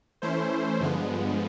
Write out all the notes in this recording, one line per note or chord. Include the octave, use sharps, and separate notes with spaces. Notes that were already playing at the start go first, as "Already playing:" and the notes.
E3 A3 C#4 E4 C5
G2 D3 F3 G#3 B3